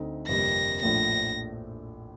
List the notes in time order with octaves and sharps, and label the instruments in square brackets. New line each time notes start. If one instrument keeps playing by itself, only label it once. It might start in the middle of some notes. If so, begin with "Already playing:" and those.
Already playing: [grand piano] D2 D3 A3 C4 D#4
[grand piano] G1 F2 C3 G3 A#3 [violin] A#6
[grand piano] A#1 A2 F3 A3 D4 [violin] A#6